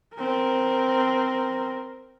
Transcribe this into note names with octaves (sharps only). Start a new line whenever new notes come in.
C4 A#4